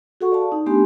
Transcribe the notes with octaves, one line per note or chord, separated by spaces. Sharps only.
F#4 G#4 A4 F#5 C#6
D5 F5 A5
D#4
A3 B3 D4 G4 G#5 C6